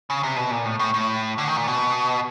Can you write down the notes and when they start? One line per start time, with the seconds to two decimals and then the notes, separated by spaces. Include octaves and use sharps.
0.10 C#3
0.23 C3
0.36 B2
0.51 A#2
0.65 A2
0.79 A2
0.94 A2
1.38 D3
1.47 D#3
1.57 A#2
1.67 B2